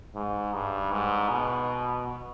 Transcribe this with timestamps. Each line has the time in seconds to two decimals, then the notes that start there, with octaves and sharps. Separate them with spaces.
0.15 G#2
0.54 G2
0.92 G#2
1.30 B2